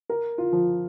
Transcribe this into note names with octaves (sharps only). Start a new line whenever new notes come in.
A#4
F4
F3